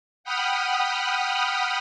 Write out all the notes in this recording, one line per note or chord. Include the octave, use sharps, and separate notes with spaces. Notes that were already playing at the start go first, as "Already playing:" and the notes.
F#5 G5 B5 D#6 F6